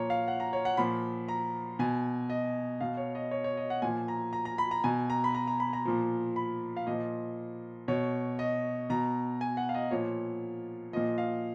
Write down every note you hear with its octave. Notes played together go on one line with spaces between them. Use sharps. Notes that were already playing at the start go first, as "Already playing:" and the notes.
Already playing: A#2 F3 C#5 A#5
F5
F#5
A#5
C#5
F#5
A#2 F3 B5
A#5
B2 G#5
D#5
B2 F5
C#5
D#5
C#5
C#5
D#5
F#5
A#2 F3 G#5
A#5
A#5
A#5
B5
A#5
B2 G#5
A#5
B5
A#5
A#5
B5
A#5
A#2 F3
B5
F5
A#2 F3 D#5
B2 C#5
D#5
B2 A#5
G#5
F#5
F5
D#5
A#2 F3 C#5
A#2 F3 D#5
F5